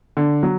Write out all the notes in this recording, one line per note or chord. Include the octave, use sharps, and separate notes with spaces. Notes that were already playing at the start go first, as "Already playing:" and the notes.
D3
F#3